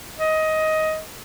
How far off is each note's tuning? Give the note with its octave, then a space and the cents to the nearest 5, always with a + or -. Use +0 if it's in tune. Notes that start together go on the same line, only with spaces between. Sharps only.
D#5 +15